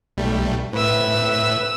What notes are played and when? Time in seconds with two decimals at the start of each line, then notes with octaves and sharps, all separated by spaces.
0.17 B1 G3 A3
0.73 A2 B4 E5 E6